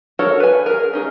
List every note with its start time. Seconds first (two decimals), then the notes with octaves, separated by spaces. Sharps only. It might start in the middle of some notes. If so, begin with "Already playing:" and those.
0.19 F#4 A4 A#4 C#5
0.40 B4 G#5
0.66 G#4 A#4
0.93 C#4 D#4 G#4